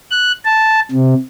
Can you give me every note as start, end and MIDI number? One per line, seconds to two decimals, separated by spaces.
0.11 0.32 90
0.45 0.80 81
0.91 1.14 48